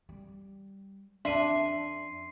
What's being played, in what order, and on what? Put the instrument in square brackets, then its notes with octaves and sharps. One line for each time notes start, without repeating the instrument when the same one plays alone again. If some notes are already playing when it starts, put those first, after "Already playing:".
[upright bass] G3
[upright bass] F2 C#4 [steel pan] D4 [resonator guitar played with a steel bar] E5 [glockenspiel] C6 C7 D#7